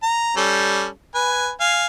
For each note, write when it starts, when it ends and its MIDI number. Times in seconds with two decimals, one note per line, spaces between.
0.03 0.36 82
0.37 0.86 55
0.37 0.86 61
0.37 0.86 69
1.15 1.50 71
1.15 1.50 80
1.60 1.87 77
1.60 1.87 80